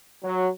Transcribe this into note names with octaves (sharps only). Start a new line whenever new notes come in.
F#3